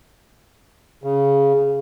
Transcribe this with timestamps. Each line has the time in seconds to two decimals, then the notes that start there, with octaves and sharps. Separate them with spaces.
1.04 C#3